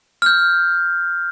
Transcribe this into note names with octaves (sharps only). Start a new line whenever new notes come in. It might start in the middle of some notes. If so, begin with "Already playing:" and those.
F6 G6